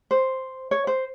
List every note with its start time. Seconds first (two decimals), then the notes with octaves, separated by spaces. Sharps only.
0.11 C5
0.71 C#5
0.87 C5